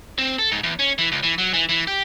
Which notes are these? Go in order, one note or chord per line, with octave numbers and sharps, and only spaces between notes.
C4
A4
G#2
E2
C#4
E3
C#2
E3
F#3
E3
E3
G4